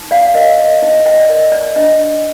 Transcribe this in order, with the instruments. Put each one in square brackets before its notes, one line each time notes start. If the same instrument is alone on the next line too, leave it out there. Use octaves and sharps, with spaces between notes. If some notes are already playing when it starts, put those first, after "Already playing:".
Already playing: [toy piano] D#4
D5 F5
A#4 D#5
D#5
D#4 D#5
D#5 G5
D5
A#4 D#5
D5
D4 D#5